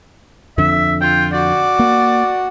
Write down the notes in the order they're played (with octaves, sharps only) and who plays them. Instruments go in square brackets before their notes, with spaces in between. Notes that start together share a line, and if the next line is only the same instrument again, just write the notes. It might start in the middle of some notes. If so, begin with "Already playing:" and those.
[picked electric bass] F2 D3 [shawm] E5
[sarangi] F4 [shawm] G5
[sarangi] F#4 [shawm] D5
[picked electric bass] A#3